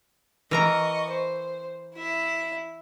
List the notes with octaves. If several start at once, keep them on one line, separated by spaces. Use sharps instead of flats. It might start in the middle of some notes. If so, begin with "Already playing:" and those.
E3 A#4 D#5 A#5 C#6
C5
E4 E5